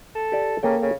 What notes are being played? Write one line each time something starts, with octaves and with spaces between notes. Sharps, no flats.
A4
G4 D5
C#3 A#3 A4 G5
C#3